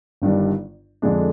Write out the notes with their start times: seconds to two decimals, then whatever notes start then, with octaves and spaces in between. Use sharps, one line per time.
0.22 G1 G2 D#3 G3 D4
1.02 F2 D3 G#3 D4